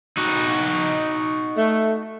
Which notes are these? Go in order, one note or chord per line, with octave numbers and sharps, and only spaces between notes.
D#4 F#4
A3